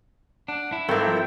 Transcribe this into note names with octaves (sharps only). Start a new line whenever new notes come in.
D4 F#5
E4
G#1 C4 A4 A#4 G5
F3